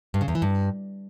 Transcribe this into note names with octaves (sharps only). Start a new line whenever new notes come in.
G2
C#3
E2
E3
G2